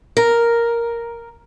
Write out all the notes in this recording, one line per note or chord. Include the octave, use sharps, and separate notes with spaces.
A#4